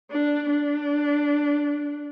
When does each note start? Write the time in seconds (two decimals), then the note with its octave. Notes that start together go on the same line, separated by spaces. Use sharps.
0.11 D4
0.50 D4